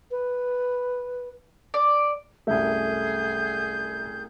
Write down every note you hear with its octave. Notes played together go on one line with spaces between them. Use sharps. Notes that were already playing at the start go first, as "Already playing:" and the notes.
B4
D5
C2 F#2 A3 G#4 A4 E5 G6